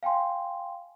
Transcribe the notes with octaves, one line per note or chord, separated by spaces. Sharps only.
F5 G5 G#5 C6